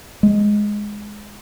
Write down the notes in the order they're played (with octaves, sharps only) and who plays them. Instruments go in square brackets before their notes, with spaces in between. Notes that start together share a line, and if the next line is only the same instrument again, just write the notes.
[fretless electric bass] G#3